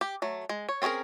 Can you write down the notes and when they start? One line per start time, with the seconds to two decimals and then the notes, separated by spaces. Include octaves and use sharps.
0.01 G4
0.22 F#3 A3
0.49 G#3
0.69 C#5
0.82 C4 C#4 F#4 G#4 A#4